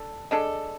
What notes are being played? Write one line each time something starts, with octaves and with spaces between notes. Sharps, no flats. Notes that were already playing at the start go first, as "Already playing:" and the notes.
Already playing: D4 A4
G#3 D4 A4